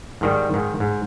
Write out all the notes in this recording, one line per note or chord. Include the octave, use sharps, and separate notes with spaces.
G#2 D#3 G3
G#2 D#3
G#2